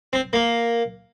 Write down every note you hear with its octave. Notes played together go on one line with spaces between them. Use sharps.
C4
A#3